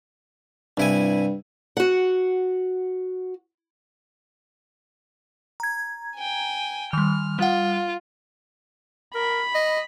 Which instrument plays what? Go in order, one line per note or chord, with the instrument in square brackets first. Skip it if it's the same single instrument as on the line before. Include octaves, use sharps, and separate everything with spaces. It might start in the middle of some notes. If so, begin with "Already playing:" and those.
[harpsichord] C2 E4 G#5 [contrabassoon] G2
[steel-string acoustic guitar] F#4 F#5
[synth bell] A#5 G#6
[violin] G5 G#5
[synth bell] D#3 G3 [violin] F6
[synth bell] G3 F#5 [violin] F4
[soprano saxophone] A#4 [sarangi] B5
[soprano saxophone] D#5